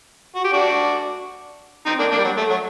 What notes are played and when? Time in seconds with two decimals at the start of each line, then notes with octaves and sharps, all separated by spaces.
0.35 F#4
0.44 G4
0.53 D4 F#4
1.86 C4 D#4
1.99 A#3 D4
2.12 A#3 D4
2.18 G3
2.24 F#3
2.37 A3
2.50 F#3